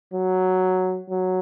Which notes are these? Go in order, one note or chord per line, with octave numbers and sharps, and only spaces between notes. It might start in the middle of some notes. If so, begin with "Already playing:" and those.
F#3
F#3